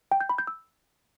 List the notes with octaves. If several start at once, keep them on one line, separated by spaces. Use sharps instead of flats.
G5
G6
B5
G6
E6